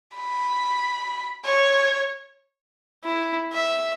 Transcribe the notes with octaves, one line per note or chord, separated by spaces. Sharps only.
B5
C#5
E4
E5